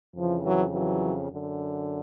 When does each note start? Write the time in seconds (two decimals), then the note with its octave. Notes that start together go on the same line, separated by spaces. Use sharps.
0.15 F2 C#3 E3 F3
0.44 E3 F#3
0.72 E3 F#3
1.29 F#2 D3